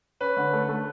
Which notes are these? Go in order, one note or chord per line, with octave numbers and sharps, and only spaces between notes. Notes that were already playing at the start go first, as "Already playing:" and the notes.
C#4 B4
D3
A3
A3